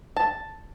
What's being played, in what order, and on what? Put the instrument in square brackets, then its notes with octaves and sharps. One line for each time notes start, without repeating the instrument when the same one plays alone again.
[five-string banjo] A5